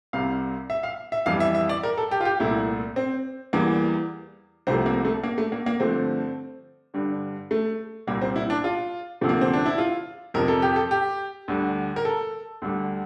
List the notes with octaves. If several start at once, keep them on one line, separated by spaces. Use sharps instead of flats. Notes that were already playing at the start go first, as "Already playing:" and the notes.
C2 C3 G3 F5
E5
F5
E5
F2 E3 G3 F5
E5
E5
D5
A#4
A4
G4
F4
G4
C2 A#2 A3 E4
C4
E2 E3 G3 A#3
C2 C3 F3 A3 C4
A#3
A3
A#3
A3
A#3
A#3
G2 D3 F3 A3 C4
G2 D3 G3
A3
C2 A#2 G3 A#3
C4
E4
D4
F4
D2 C3 F3 A3
A#3
C4
D4
E4
F4
F2 C3 F3 A#4
A4
G4
A4
G4
D2 D3 G3
A#4
A4
D2 D3 G3